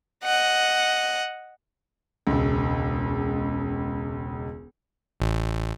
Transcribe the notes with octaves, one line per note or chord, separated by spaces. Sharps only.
D#5 F#5
E1 C#2
A1